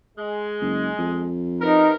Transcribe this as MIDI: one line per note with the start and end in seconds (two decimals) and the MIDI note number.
0.18 1.31 56
0.61 0.90 30
0.98 1.94 41
1.61 1.96 48
1.61 1.96 59
1.61 1.90 63
1.61 1.96 70